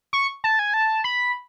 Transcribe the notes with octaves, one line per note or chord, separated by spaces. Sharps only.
C#6
A5
G#5
A5
B5